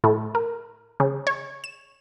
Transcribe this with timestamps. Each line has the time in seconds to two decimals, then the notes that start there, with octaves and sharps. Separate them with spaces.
0.04 A2
0.35 A#4
1.00 C#3
1.27 C#5
1.64 E7